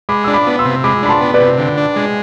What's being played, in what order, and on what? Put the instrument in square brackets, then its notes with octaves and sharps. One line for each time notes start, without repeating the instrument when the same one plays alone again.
[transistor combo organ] G#3 [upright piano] B5 D6
[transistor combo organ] D4 [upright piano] E6
[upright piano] B5 D6
[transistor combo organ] B3
[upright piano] C6 E6
[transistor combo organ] C3
[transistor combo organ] G#3 [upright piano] B5 D6
[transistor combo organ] D4 [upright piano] B5
[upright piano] A5 C6
[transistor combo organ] B3
[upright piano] B4 D5
[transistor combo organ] C3
D3
D4
G#3